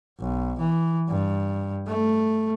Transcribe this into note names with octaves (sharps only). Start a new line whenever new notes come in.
B1
E3
G2
A3